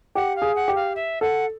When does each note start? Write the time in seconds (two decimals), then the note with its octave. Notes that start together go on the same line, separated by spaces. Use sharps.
0.15 G4 F#5
0.36 F5
0.42 G#4
0.55 F#5
0.68 G4
0.75 F5
0.95 E5
1.21 A4 F#5